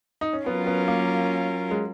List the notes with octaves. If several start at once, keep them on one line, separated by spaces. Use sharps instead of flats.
D#4
C#4
F#3 B3 C#4 F4 A#4
B3
A#3
G#3